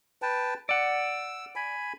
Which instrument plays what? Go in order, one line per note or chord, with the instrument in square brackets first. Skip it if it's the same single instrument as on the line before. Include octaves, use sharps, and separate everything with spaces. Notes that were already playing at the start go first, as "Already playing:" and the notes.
[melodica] B4 G5 A5
[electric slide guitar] D5 F#5 [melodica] E6
[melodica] G#5 B5